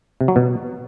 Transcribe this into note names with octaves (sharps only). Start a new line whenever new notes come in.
C3
F#3
B2